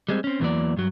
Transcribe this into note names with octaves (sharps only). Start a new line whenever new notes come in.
G3 G#3 C4
C4 C#4
E2 C3 E3 F#3 A#3 D5
G2 F#3